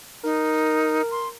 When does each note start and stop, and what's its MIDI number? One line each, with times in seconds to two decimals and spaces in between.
0.24 1.02 63
0.24 1.37 70
1.11 1.28 84